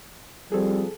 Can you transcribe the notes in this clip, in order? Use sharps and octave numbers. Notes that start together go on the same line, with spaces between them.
F3 G3 C4 G#4 A4